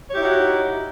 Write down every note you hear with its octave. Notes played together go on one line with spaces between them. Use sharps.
D#4 E4 F#4 G4 C#5